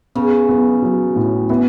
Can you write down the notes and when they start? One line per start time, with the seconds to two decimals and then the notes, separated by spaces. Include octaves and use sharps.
0.15 C#3 B3
0.49 B3
0.82 F#3
1.16 A2
1.49 E3 B3